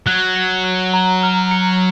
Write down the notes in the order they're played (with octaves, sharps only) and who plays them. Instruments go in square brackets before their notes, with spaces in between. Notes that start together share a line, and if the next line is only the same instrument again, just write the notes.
[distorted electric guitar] F#3 [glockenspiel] F#6
[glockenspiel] C#7
F#6
A#5
F6
C#7